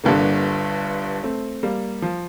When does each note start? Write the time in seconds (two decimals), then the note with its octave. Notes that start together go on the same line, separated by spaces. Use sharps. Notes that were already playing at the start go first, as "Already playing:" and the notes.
0.04 G1 G2 D3 G3 A#3
1.23 A3 C4
1.63 G3 A#3
2.02 F3